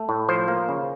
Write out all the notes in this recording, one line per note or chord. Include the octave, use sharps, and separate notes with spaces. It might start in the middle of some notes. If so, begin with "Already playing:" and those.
Already playing: A3
A2
F3 C5
A#3
C#3